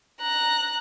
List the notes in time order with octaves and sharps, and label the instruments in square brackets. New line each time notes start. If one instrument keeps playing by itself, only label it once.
[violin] A#5 F#6